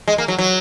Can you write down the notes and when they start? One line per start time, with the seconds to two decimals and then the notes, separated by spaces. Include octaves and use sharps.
0.08 G#3
0.18 A#3
0.28 F#3
0.39 F#3